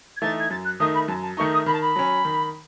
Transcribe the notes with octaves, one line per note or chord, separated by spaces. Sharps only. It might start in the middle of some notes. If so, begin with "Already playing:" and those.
G#6
E3 A3 D#4 A6
G#6
F#2 A6
F#6
D#3 A3 D#4 D#6
B5
F#2 A5
A5
D#3 A3 D#4 C#6
D#6
D#3 B5
A5
B5
F#3 C#4
D#3